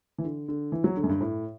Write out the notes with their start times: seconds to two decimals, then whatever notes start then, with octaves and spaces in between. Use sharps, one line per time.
0.18 E3
0.24 D3
0.48 D3
0.72 E3
0.84 F#3
0.97 D3
1.04 F#2
1.09 G2
1.21 A2